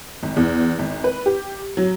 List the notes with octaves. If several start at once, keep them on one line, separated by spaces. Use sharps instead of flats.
G#1
E2
G#1
B4
G4
F#3